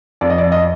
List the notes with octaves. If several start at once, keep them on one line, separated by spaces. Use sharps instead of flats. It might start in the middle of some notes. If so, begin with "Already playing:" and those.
F2 D5
D#5
D5
D#5